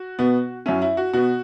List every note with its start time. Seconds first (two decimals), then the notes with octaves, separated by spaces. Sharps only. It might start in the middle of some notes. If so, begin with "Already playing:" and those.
Already playing: F#4
0.19 B2 B3
0.66 F#2 F#3 C#4 E4
0.82 E4
0.97 F#4
1.13 B2 B3 F#4